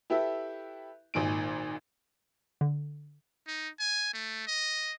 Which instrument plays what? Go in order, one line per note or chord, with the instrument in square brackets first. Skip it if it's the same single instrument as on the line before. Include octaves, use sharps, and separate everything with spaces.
[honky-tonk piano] E4 G4 A4 B4 E5
G#1 A#2 D#3 G#5 D7
[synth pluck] D3
[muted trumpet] D#4
G#5
A3
D#5